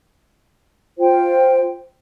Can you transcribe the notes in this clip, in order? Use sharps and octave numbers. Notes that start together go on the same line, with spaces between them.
F4 C5 G5